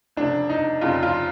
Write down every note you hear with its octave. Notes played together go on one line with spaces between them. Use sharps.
F1 F2 C#3 D4
D#4
F1 F2 C#3 F4
F4